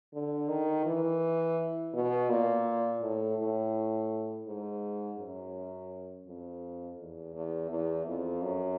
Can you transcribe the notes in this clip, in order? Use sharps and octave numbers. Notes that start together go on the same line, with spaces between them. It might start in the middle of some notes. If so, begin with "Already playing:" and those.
D3
D#3
E3
B2
A#2
A2
A2
G#2
F#2
F2
E2
E2
E2
F2
F#2